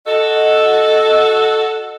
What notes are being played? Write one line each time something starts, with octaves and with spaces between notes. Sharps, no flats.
F#4 A4 D#5